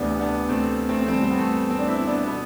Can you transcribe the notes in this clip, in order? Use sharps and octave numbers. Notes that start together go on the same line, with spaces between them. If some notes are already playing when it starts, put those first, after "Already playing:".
Already playing: D2 C3 E3 B3 D4
B3 D4
A3 C4
A3 C4
G2 E3 A3 C4
C4
B3
A3
C4
D4
C4 E4
B3 D4
B2 B3